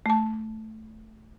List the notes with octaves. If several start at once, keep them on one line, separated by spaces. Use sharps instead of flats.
A3 A5